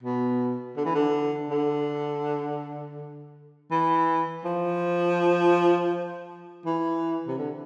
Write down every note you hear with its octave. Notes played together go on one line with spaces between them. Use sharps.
B2
D3
E3
D3
D3
E3
F3
E3
C3
D3